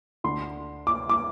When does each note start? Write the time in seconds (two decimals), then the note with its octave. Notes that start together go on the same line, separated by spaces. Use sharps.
0.24 D2 D3 C6
0.87 D6
1.10 D6